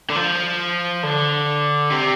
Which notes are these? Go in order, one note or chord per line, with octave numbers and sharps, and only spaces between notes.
D3
F3
D3
C3